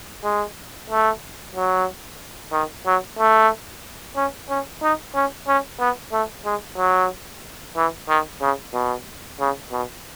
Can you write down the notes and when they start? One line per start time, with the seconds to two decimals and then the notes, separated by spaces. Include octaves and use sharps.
0.24 G#3
0.90 A3
1.55 F#3
2.53 D#3
2.86 F#3
3.19 A3
4.16 C#4
4.49 C#4
4.82 D#4
5.15 C#4
5.48 C#4
5.80 B3
6.12 A3
6.45 G#3
6.77 F#3
7.76 E3
8.09 D#3
8.41 C#3
8.73 B2
9.40 C#3
9.72 B2